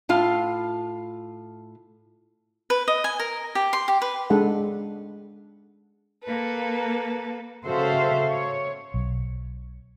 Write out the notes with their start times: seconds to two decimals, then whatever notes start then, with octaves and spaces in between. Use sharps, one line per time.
0.09 A2 F4 F5
2.70 B4
2.88 D#5
3.04 G#5
3.20 A#4
3.55 G4
3.73 C6
3.88 G4
4.02 B4
4.30 G#3 D4 A4 F#5
6.23 A#3 A4 B4
7.66 C#3 F#4 A4 C5 E5 F5
8.29 C#5
8.94 B1